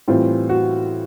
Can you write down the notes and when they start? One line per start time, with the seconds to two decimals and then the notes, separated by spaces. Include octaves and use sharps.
0.08 A2 E3 G3 C4 F4
0.49 F#4